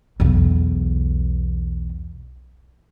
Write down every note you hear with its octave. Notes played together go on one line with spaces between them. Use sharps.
B1 E2